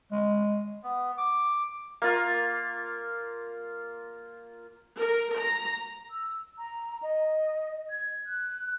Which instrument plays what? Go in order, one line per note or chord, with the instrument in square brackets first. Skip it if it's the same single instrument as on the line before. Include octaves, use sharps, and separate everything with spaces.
[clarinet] G#3
[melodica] B3
D6
[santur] A#3 F4
[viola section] A#4
A#5
[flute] E6
A#5
D#5
G#6
F#6